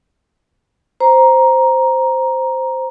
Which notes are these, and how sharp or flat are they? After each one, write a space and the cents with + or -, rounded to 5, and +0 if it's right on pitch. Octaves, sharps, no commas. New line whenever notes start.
C5 +0 A#5 +10